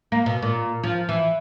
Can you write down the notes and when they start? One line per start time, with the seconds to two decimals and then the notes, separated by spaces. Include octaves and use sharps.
0.12 A#3
0.26 B2
0.42 A#2
0.83 F3
1.09 E3